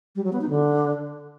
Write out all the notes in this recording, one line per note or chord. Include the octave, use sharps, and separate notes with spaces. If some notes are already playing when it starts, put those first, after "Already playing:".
G3
F#3
B3
D#4
D3